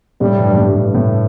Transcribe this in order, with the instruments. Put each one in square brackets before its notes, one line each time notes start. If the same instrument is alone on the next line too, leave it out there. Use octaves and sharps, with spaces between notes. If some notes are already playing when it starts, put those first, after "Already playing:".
[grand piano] A2 [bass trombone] G3
[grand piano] G2
G2
A2
G2
A2